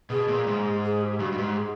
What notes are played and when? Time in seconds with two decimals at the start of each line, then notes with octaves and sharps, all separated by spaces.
0.10 B2 G#4
0.28 A#2
0.47 G#2
0.83 G#4
1.01 G4
1.20 G2 F#4
1.32 G2
1.37 G#2 G4
1.56 G#4